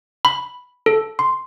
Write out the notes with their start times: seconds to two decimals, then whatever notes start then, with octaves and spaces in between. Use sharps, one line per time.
0.25 B5
0.86 A4
1.19 C6